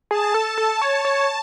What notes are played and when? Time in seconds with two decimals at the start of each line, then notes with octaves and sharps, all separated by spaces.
0.10 G#4 A5
0.34 A4
0.58 A4
0.82 C#5 A5
1.05 C#5